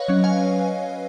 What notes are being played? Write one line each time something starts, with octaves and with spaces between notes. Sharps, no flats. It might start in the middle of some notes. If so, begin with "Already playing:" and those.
Already playing: B4 C#5 D#5 F5
F#3 C#4
F5 G#5